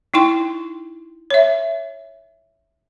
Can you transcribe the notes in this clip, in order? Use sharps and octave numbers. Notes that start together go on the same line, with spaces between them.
D#4 E4 G5 C6
C#5 E5